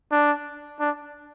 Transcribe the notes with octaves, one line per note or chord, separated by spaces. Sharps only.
D4
D4